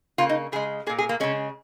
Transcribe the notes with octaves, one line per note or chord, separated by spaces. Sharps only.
C#3 A#3 F4
D#4
C#3 G#3 G#4
A#2 A#3 G#4
G#4
A#3
C#3 G#3 C#4